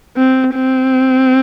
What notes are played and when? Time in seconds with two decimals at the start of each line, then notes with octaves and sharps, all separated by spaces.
0.17 C4
0.55 C4